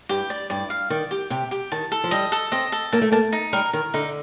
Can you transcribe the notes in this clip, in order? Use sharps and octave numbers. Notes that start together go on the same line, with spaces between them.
G2 G4
D5
G2 D5
F5
D#3 D5
G4
C3 G4
G4
D#3 A5
A4
F3
G3 D#5
A4
C4 D#5
A4
A#3 A5
A3
A#3 A5
D#4
G3 A#4
D#3 A#4
D3 D#4